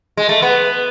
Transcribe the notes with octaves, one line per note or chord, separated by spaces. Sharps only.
G#3
A3
B3